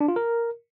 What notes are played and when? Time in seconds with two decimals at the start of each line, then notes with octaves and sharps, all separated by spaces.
0.01 D4
0.08 F4
0.16 A#4